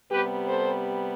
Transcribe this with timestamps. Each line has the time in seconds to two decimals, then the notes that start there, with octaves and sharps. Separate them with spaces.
0.11 C3 G3 B3 G4 B4
0.48 A4 C5